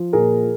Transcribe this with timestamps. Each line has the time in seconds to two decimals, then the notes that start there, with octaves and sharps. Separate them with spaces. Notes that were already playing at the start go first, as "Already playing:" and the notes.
Already playing: F3
0.13 A#2 G#4 A#4